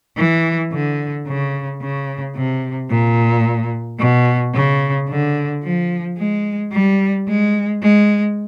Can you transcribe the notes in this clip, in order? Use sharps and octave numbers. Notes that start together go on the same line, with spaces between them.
E3
D3
C#3
C#3
C3
A#2
B2
C#3
D3
F3
G#3
G3
G#3
G#3